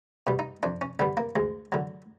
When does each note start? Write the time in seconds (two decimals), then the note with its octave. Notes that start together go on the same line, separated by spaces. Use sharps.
0.27 B2 G3
0.39 D#4
0.63 F2 D4
0.81 C#4
0.99 D3 G3 B3
1.17 A#3
1.36 D2 G#3
1.72 D3 F#3